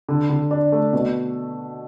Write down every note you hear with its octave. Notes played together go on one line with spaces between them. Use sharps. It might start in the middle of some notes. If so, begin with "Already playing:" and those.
D3
D3
D4
A3
B2